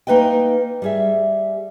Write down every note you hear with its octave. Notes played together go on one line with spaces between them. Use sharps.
A#3 D#4 B4 D#5 G5
G3 G#4 E5